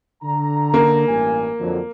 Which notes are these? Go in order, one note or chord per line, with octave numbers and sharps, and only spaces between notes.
D3 A#5
A#3
A1 G2 G#5
F2 D3 F#3